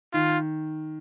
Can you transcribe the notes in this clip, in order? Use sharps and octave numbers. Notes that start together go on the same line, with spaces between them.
D#3 F4